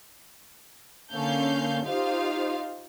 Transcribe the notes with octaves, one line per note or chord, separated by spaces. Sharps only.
D3 A#3 C#4 A4 F5 G6
D#4 F4 G4 C5 F5